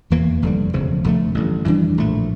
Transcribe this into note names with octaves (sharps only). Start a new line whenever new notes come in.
F1 E2 E3 A#3
F1 F2 D3 G3
E1 D2 C#3 F3
F1 F2 D3 A3
A1 G2 D3
F2 E3 G3 D4
A#1 A2 F3 A3